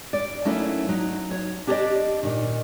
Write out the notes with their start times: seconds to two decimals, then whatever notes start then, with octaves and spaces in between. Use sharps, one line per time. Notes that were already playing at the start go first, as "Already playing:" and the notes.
0.13 D5
0.45 F#3 A3 A#3 C#4 D#4 E4
0.89 F#3 D#4
1.31 C#5
1.67 D4 G4 G#4 C5 D5 D#5
2.23 A#2 D#3